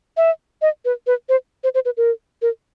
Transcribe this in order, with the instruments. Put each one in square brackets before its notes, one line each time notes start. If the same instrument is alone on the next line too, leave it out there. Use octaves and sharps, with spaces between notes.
[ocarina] E5
D#5
B4
B4
C5
C5
C5
B4
A#4
A#4